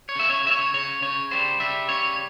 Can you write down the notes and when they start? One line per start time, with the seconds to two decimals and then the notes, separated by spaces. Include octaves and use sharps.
0.09 C#5
0.16 C#3 E5
0.30 C#5
0.44 C#3 E5
0.51 C#5
0.74 C#3 C#5
1.02 C#3 C#5
1.31 G3 C5
1.60 G3 E5
1.89 C#3 C#5